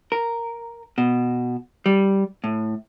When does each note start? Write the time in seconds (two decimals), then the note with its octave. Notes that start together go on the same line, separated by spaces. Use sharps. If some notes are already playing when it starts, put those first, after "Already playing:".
0.12 A#4
0.98 B2
1.86 G3
2.44 A2